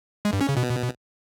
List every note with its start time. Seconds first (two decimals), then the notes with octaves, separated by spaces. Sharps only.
0.25 G#3
0.33 G2
0.41 C#4
0.49 C#3
0.57 B2